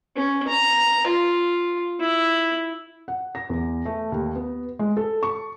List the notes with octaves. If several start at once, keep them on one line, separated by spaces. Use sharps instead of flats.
C#4
A#5
F4
E4
F#5
A#6
E2
A3
D#2
B3
G#3
A4
C#6